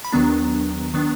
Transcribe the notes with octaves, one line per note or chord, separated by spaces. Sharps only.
B5
D#2 D#3 F#3 B3 D4 A#5
D#3 F#3 B3 D4